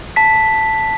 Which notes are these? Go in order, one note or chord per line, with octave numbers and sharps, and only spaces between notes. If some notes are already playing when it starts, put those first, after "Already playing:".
A5 B6